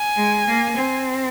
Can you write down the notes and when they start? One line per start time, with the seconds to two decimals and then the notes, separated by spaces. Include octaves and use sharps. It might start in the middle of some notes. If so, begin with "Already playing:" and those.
Already playing: G#5
0.16 G#3
0.47 A#3
0.76 C4